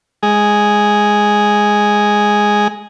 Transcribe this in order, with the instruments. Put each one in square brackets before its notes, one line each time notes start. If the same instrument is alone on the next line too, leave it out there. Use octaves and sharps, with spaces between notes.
[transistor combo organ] G#3 G#4